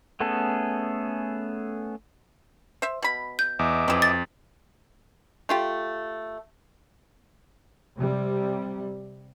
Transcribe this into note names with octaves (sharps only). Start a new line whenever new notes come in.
A3 B3 C#4 G#4 A4
C5 E5
B2 B5
G6
E2 D#5 E5 D6
F2 E3 F#3
A6
A3 F4 G4
C3 G3